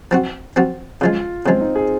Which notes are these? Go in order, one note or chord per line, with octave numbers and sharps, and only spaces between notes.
F3 C4 F#4
F3 C4 F#4
C#3 F3 G#3 F4
C#3 F3 G#3 C4
D#4
G#4